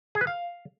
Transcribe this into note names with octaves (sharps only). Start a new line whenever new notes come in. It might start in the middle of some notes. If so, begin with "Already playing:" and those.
G#4
B4
F5